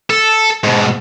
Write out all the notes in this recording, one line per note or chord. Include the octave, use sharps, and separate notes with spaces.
A4
G#2 B2